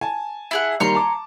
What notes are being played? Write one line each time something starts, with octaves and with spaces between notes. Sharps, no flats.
G#5 A5
E4 G#4 F#5
D#3 G3 A#3 C#5 A#5 C6
A5 D6